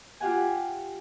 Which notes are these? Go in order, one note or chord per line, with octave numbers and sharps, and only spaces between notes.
F4 G4 F#5 G#5